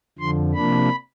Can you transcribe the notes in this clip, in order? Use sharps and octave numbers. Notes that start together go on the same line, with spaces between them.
F2 D3 F3 C6
C3 F3 A#3 D4 B5